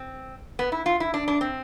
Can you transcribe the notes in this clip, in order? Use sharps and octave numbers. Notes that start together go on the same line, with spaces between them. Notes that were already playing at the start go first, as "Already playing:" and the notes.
Already playing: C4
B3
E4
F4
E4
D4
D4
C4